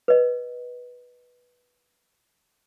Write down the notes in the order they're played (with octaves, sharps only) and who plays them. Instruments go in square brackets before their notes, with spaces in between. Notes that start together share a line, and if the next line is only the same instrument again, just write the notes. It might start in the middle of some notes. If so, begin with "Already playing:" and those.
[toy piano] B4 D#5